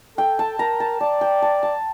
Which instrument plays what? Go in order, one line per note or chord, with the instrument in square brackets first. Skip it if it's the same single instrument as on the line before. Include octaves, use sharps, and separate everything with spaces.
[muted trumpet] A4 [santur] G5
[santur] A5
[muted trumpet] A#4 [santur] A#5
[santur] A5
[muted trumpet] D5 [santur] A5
[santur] G5
A5
A5